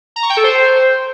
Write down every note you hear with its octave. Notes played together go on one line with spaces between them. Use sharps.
A#5
C#6
G5
A4
C5